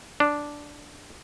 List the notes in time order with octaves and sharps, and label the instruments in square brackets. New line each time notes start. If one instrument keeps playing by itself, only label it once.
[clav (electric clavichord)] D4